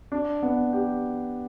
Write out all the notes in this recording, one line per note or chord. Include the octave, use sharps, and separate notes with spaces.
D4
B3
G4